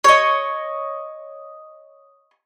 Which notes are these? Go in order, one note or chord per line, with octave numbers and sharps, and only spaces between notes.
C#5 D#5